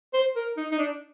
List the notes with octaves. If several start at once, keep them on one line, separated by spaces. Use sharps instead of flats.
C5
A#4
D#4
D#4
D4